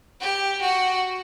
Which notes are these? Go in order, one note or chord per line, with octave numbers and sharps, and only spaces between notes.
G4
F#4